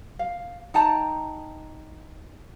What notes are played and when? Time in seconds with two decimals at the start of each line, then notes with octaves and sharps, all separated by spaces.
0.19 F5
0.74 D#4 G5 A5 A#5